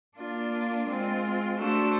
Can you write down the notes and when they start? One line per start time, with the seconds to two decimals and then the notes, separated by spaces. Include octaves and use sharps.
0.18 A#3 D4 F4
0.88 G#3 C4 F4
1.59 A3 D4 F#4 A4 C5